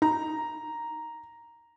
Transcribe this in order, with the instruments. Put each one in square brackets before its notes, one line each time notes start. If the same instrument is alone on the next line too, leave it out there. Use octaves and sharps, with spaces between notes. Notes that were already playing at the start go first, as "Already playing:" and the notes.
[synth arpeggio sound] D#4 [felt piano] A#5